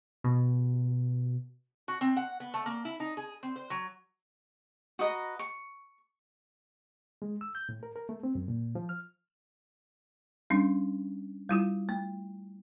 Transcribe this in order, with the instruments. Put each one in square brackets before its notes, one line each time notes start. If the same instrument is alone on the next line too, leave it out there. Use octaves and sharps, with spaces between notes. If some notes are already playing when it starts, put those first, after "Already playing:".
[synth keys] B2
[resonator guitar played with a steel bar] F#4
C4
F#5
B3
A3
A#3
E4
D#4
G#4
C4
C5
F#3
[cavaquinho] F#4 B4 D#5 A#5
C#6
[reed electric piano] G#3
E6
G6
A2
A#4
A#4
A3
C4
F#2
A#2
F3
F6
[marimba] G3 C#4 D4
G3 E4 F4
A3